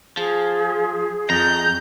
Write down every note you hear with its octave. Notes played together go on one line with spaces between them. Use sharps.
F3 G#4
F2 A#5 G6